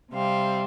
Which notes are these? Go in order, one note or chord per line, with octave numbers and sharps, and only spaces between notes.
C3 G3 C4 F5